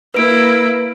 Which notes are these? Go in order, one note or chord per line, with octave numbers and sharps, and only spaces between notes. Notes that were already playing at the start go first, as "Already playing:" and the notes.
A#3 E4 B4 D7